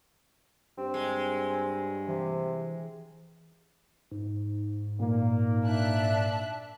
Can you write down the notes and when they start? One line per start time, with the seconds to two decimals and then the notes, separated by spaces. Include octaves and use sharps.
0.78 G2 C4
0.94 G#3
2.08 C3 E3
4.11 G#2
5.00 A#2 A#3
5.64 D4 E5 F#6